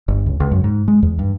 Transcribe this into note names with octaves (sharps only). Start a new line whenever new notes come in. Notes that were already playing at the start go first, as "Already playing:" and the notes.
G1
C#2
C#2
F#2
G#2
G#3
E2
G2